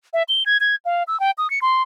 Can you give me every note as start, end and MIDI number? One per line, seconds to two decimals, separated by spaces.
0.13 0.23 76
0.28 0.43 103
0.46 0.57 92
0.60 0.75 92
0.85 1.03 77
1.07 1.19 88
1.20 1.31 79
1.38 1.50 87
1.50 1.59 97
1.62 1.82 84